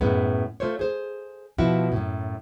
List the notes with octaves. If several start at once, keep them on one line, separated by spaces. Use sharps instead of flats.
F#2 A2 G#3 B3
A3 F4 C5 C#5
G#4 C5
B2 F3 E4 F#4
F#2 A2